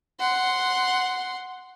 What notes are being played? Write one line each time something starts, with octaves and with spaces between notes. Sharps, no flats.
F#5 C6